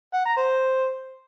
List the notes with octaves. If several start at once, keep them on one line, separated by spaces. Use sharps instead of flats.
F#5
A#5
C5